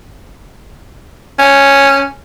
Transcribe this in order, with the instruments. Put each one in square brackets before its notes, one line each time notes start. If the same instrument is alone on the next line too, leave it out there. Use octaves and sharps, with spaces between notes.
[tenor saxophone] C#4